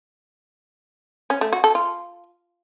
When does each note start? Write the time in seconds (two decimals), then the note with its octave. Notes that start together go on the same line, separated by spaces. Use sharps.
1.30 C#4
1.41 A3
1.53 F#4
1.64 A4
1.75 F4